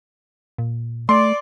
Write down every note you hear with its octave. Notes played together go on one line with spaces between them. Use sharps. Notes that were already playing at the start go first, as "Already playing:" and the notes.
A#2
A3 D5 C6